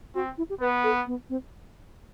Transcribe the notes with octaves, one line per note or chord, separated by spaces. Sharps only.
C4 F#4
E4
G4
B3 B4
A4
B3
C4